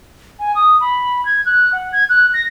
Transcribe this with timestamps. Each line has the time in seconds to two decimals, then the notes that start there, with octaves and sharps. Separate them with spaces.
0.39 G#5
0.55 D#6
0.81 B5
1.25 G#6
1.46 F#6
1.73 F#5
1.92 G#6
2.09 F#6
2.34 A#6